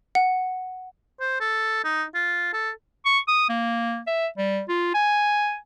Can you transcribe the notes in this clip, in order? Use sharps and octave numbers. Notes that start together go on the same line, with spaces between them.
F#5
C5
A4
D#4
F4
A4
C#6
D#6
A#3
E5
G3
F4
G#5